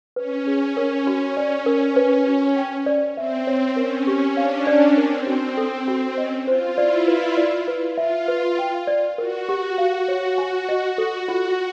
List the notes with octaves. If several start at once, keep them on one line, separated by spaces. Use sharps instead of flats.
C#4 B4
G#4
A#4
F#4
C#4 D5
A#4
B4
F#4
G5
D5
C4 E5
C4 C#5
C#4 A#4
G4
D4 F5
D5
C4 A#4
F#4
A4
F#4
C#4 D#5
F4 C5
E4 D5
B4
D5
B4
F4 E5
B4
G5
D5
F#4 A#4
G4
F#4 F5
C#5
G#5
D#5
F#4 A4
F4